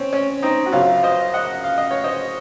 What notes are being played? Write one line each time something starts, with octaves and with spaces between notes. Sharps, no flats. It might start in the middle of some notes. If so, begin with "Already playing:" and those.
Already playing: C4 C#4
C#4
C4 D#4
F#4
F#2 C#3 F#3 C#4 F4
C5 D#5
D#5 F#5
F5
D#5
C#5
C5 D#5